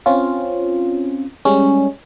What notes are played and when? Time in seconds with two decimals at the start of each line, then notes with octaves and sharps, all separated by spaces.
0.06 C4 C#4 F4
1.45 G3 G#3 C#4